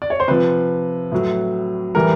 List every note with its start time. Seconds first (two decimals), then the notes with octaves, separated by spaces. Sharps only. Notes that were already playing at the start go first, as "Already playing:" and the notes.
0.02 D5
0.10 C#5
0.20 C5
0.28 C3 F3 B4
1.12 A2 F#3
1.95 A2 E3 G3 A#4